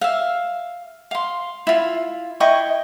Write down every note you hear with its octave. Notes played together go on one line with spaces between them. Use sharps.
E5 F5
F5 C6
E4 F4
E4 D#5 G5 C#6